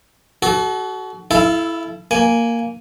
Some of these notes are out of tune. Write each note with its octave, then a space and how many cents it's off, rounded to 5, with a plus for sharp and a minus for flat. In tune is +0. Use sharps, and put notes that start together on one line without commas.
F#4 +20 A4 -35
E4 +0 A4 -20 F5 -35
A#3 -5 G#5 +0